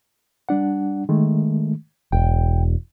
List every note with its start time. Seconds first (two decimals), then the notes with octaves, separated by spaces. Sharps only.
0.49 G3 D4 F#5
1.09 D#3 G#3 A3
2.12 E1 G5